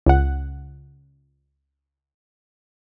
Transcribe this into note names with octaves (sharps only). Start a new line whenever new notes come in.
C#2 F#5